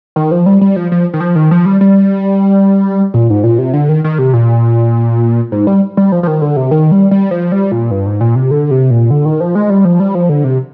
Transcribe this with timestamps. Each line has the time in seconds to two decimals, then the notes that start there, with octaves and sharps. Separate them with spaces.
0.16 D#3
0.31 F3
0.46 G3
0.61 G3
0.76 F3
0.92 F3
1.14 D#3
1.20 F3
1.36 D#3
1.51 F3
1.65 G3
1.81 G3
3.14 A#2
3.30 G#2
3.44 A#2
3.59 C3
3.73 D3
3.89 D#3
4.04 D#3
4.18 C3
4.33 A#2
5.52 G#2
5.67 G3
5.97 G3
6.12 F3
6.23 F3
6.27 D#3
6.41 D3
6.56 C3
6.71 D#3
6.91 G3
7.11 G3
7.31 F3
7.52 G3
7.72 A#2
7.91 G2
8.06 G#2
8.21 A#2
8.35 C3
8.51 D3
8.71 C3
8.90 A#2
9.11 D3
9.25 D#3
9.40 F3
9.55 G#3
9.70 G3
9.85 F3
10.00 G3
10.15 F3
10.29 D3
10.44 C3